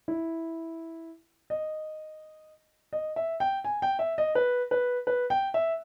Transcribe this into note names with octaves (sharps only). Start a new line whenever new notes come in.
E4
D#5
D#5
E5
G5
G#5
G5
E5
D#5
B4
B4
B4
G5
E5